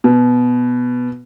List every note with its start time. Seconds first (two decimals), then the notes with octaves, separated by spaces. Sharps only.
0.04 B2